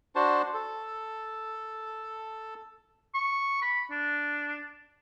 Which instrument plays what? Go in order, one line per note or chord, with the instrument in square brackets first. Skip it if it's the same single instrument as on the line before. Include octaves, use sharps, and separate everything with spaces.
[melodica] D4 F#4 C5 A5
A4
[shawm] C#6
B5
D4